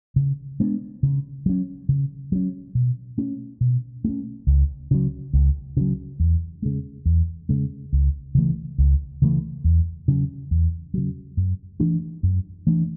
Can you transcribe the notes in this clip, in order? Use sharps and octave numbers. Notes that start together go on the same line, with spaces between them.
C#3
G#3 B3 D4
C#3
F#3 C#4
C#3
F#3 C#4
B2
A3 C#4
B2
A3 C#4
C#2
C#3 F#3
C#2
C#3 F#3
E2
C#3 G#3
E2
C#3 G#3
C#2
C#3 E3 A3
C#2
C#3 E3 A3
E2
C#3 F#3
E2
C#3 F#3
F#2
E3 A3 D4
F#2
E3 A3 D4